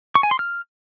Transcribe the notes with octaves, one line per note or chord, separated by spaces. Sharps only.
C#6
G#5
C6
F6